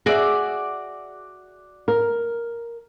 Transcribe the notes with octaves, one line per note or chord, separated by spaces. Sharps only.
F#4 G#4 D5 E5
A#4